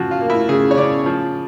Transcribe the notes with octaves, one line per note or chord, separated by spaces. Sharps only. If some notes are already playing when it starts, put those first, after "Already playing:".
Already playing: C#3 F3 F#4
F4
A#3
E4
C#3 G#4
C#5
C#3 D5
F3